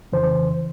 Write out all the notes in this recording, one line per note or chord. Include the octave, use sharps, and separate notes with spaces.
F2 C#3 E3 C5